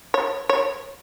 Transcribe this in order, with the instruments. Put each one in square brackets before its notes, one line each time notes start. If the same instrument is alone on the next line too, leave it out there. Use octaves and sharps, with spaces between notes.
[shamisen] C#5
C#5